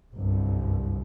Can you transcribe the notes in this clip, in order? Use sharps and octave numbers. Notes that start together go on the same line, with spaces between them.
G1 C2 F#2